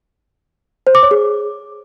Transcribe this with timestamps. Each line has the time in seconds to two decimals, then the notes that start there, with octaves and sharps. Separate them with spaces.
0.87 C5
0.95 D6
1.03 C#5
1.11 G#4